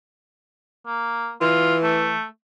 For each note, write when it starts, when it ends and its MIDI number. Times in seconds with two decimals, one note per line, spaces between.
0.86 1.32 58
1.41 2.16 52
1.41 1.75 65
1.83 2.25 57